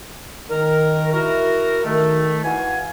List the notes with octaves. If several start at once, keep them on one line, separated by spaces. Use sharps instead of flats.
D#3 A#4
E4 F#4 A#4
D#3 A3
E3 F#4 F5 G#5